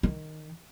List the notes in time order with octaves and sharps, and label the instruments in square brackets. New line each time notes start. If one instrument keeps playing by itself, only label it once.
[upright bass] D#3